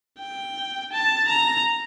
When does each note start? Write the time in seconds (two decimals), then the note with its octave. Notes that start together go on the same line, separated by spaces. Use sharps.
0.19 G5
0.93 A5
1.28 A#5